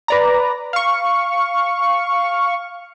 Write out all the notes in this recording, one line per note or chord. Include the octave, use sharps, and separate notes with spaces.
B4 D5 A#5
F5 C#6